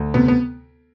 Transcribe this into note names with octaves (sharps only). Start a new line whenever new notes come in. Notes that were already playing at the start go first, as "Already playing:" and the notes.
Already playing: D2
C3 B3
B3